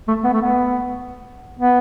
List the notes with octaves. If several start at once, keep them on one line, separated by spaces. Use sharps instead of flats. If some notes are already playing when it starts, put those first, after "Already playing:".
A3
B3
A3
B3
B3